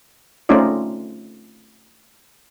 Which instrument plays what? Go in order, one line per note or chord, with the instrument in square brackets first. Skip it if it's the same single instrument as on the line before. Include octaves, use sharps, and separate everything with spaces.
[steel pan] A3 C4 C#4 D#4 F4 D5